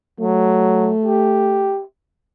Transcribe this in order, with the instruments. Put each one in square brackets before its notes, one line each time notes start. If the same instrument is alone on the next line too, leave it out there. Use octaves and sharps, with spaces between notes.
[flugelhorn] F#3 [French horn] A3
[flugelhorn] G4